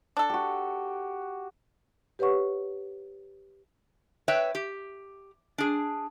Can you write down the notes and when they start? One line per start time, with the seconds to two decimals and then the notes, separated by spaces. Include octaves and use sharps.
0.17 D4 A4
0.29 F#4 G4
2.19 G4 B4 C#5 F#5 C#6
4.28 B4 C#5 E5 G5
4.55 G4
5.58 D4 G#4